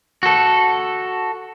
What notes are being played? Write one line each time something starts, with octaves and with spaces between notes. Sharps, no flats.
F#4 A4